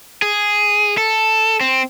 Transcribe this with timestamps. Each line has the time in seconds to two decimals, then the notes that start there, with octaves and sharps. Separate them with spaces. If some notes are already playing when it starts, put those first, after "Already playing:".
0.22 G#4
0.98 A4
1.61 C4